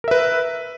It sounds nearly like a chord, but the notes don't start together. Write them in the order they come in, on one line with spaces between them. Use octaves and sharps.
A#4 E5 B4